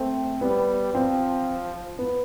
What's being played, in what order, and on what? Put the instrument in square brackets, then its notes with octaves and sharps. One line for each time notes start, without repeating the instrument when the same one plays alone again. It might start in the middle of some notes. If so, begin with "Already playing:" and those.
Already playing: [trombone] A3 [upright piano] C4
[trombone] G3 [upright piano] B3
[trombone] F3 [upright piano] C4
[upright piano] B3